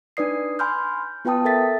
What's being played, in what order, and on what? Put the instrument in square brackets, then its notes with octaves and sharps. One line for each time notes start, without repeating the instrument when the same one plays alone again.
[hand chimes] D4 D#4 B4 D5 D#6 C7
G#5 B5 C6 F6 G6
B3 F4 B4 G5 A5 D#6
A4 A#4 E5 A6 B6